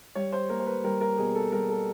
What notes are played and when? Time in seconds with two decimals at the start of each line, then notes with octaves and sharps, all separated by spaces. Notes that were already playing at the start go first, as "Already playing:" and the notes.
0.15 G3 C#5
0.33 C5
0.49 A#3 A#4
0.60 C5
0.67 B4
0.84 G3 A#4
1.01 A#4
1.18 B2 G#4
1.35 A4
1.52 G3 A#4
1.70 A4